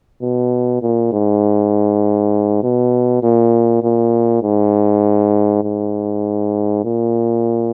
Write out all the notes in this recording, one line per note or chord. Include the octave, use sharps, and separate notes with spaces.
B2
A#2
G#2
B2
A#2
A#2
G#2
G#2
A#2